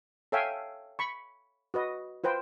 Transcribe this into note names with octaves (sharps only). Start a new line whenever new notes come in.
A4 C#5 E5 F5 G5 G#5
B5 C#6
F#4 B4 D#5
F4 B4 C5 G5